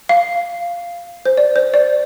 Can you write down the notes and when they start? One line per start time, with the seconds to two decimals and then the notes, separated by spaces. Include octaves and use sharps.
0.09 F5
1.26 C5
1.37 D5
1.56 C5
1.74 D5